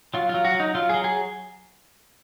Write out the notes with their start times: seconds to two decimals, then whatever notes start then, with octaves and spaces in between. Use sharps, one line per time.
0.14 F#3 F4
0.29 F#3 F4
0.45 F#4
0.54 F#3
0.60 D#4
0.75 F#3 F4
0.89 F#3 G#4
1.04 G#4